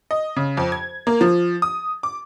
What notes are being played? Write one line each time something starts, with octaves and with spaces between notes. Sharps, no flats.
D#5
C#3
F2
G#6
A#3
F3
D#6
D6